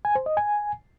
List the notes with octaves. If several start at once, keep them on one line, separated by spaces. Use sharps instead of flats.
G#5
C5
D#5
G#5